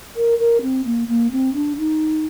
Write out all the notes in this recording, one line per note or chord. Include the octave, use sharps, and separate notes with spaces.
A#4
A#4
C4
A#3
A#3
C4
D4
D#4